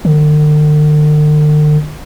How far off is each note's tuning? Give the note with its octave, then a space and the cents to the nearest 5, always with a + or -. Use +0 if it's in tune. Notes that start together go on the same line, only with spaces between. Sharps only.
D3 +45